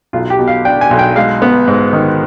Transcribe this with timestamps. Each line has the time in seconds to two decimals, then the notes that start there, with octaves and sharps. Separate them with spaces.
0.13 B1 F4
0.30 G4
0.39 B2
0.48 F5
0.65 D4 G5
0.81 G#5
0.91 B1
0.99 G5
1.16 G#3 F5
1.42 B3
1.68 G#2
1.93 D#3